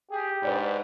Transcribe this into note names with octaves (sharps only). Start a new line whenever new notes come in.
G4 G#4
G#2 B4 D5